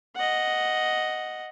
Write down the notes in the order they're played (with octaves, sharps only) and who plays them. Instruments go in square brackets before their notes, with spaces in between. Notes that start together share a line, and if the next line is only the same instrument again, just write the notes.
[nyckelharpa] D#5 F#5